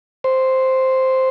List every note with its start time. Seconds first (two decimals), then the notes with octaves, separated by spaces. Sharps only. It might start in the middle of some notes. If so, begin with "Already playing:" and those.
0.24 C5